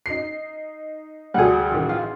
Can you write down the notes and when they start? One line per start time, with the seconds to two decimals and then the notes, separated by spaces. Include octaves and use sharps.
0.06 D#4 C7
1.34 D2 G3 G#4 F#5
1.71 A1 D#3
1.89 F4